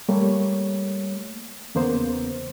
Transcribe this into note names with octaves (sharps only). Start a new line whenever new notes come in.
G3 A3 A#3 C#5
E2 C#3 A#3 B3 C5